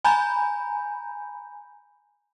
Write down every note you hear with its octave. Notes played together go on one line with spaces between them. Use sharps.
G#5 A#5 B5 G6